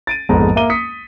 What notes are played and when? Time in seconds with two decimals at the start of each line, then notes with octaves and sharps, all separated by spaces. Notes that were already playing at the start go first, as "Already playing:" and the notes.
0.07 A6 D7 D#7
0.29 A#1 F2 G#2 B3 A4 A#5
0.56 A#3 E5 A#5 D6 D#7 G7
0.70 D#6 B6 C#7